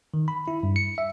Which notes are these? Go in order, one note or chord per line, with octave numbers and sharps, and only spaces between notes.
D#3
B5
E4
G2
C#7
E5